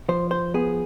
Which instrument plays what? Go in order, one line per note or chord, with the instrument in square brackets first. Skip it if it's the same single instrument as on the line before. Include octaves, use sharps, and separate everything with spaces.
[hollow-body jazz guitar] F3 C5
C5
B3 G#4